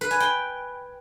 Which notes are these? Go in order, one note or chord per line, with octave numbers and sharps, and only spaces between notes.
B4
G#5
G5